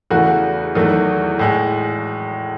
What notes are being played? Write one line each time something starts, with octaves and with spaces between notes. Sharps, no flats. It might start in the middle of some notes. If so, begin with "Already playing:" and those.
E2 C#3 E3 A3 F#4
E2 D#3 F#3 A3
A2 G#3